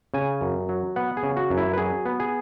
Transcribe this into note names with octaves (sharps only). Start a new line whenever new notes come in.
C#3 G#5
F#2
F#3
B3 F#5
G#4
C#3
F#4
F#2
E4
B4
F#3 G#4
B3
G#4